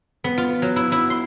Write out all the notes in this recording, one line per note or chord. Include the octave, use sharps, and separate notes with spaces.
B3
F4
F#3
E4
E4
C6